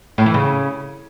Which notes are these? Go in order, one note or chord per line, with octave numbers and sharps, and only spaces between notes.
A2
E3
C#3